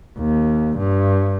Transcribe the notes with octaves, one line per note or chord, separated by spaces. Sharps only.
D#2
G2